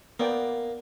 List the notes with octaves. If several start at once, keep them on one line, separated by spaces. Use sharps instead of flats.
A#3 B3 D5 G5